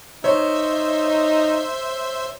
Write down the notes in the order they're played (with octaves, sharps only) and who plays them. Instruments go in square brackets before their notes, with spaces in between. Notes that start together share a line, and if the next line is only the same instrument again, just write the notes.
[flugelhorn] D#4 [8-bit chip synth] C5 E5 [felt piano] C#5